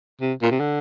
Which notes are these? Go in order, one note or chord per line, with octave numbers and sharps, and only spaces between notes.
C3
A#2
C3
D3